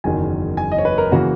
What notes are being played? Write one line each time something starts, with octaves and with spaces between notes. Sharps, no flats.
F#1 E2 D#3 F#3 G#5
G#5
D#5
C#5
B4
A#4
C#3 E3 A#3 F#4